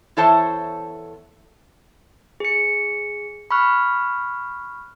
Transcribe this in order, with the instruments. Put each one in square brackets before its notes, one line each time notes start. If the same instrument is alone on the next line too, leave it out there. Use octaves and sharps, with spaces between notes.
[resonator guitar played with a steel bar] E2 E4 A4 C5 C#5 A5
[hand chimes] G#4 C#7
B5 C#6 F6 F#6